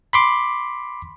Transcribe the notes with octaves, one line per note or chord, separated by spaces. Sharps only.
B5 C6 D6